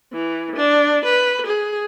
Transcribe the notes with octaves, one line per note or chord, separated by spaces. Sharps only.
E3
D4
B4
G#4